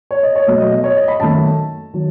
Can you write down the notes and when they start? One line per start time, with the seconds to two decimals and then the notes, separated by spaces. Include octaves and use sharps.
0.11 C#5
0.23 D#5
0.35 C#5
0.47 B2 F#3 A3 D#5
0.60 D#5
0.71 D#5
0.84 C#5
0.97 D#5
1.08 B5
1.20 F#2 D#3 A3 A5
1.93 D#3 F#3